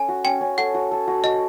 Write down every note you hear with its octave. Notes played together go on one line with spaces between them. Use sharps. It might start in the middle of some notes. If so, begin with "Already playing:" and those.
Already playing: C#4 A4 G#5
F#4
C#4 G5
C#4
A4 F#5
F#4
A4
F#4
F#4 D#5